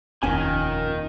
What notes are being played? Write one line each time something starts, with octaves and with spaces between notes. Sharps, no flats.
F1 D#2 A#2 D#3 C#4 G#5